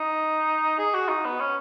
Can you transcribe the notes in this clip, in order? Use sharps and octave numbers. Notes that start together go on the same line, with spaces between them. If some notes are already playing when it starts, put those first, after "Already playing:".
Already playing: D#4
G#4
F#4
D#4
B3
C#4